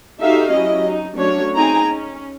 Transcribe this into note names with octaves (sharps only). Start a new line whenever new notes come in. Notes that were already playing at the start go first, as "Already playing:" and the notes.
D#4 F#4 G4 A4 E5 F5
F#3 C#4 E4 G4 D#5
D#4
F#3 A3 C#4 D4 C#5
C4 D#4 G#4 G5 G#5 A#5
C#4